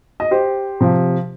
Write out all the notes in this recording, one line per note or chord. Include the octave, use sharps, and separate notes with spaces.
D#5
G4 C5
C3 F3